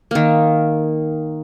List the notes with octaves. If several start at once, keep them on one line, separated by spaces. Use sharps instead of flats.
D#3 A#3